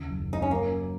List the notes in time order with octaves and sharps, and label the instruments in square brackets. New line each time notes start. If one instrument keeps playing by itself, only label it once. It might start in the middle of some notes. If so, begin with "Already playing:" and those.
Already playing: [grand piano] D#2 C#3
F#1
[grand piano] F#1 [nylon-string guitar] D#4
[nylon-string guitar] C#4
[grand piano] F#2 [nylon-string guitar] A#3
[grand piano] F#4